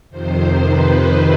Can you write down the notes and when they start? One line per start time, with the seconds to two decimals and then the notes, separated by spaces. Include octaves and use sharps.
0.10 F2 C3 D#3 C5
0.65 B4